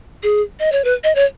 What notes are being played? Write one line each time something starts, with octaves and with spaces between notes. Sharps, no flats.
G#4
D#5
C#5
B4
D#5
C#5